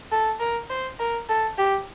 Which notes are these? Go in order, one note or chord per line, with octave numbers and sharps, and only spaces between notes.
A4
A#4
C5
A#4
A4
G4